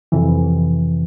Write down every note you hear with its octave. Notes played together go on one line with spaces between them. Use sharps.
F2 C3 E3